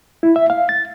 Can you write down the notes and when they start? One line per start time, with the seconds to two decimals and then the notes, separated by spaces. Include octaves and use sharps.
0.23 E4
0.36 E5
0.50 F5
0.69 A6